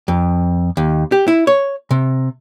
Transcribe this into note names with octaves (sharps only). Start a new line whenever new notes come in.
F2
D#2
G4
E4
C#5
C3